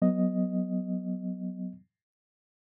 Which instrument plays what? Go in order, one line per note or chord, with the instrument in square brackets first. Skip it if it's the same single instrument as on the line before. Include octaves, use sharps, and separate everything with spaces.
[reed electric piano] F#3 B3 D#5